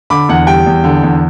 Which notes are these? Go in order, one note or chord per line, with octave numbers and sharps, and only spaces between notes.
D3 B5 D6
E2 F#5
G3 G5
E2
D3
E2